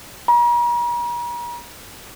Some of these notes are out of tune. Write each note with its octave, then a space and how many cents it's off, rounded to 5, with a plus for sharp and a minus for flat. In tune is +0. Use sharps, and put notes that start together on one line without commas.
A#5 +45